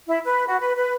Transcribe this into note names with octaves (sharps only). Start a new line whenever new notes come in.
E4
B4
F#4
B4
B4